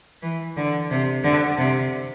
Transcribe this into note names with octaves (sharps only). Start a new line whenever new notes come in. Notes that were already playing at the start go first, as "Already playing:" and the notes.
E3
D3
C3
D3
C3